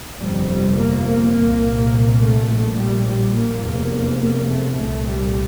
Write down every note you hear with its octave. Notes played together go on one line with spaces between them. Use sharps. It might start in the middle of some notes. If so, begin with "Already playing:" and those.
G1 F2 C3 G3
G3
A#3
A#3
C2 A#2
A3
A#1 A#2
G3
G3
A#3
F1 E2 C3
A#3
A3
C2 A#2 A3
G3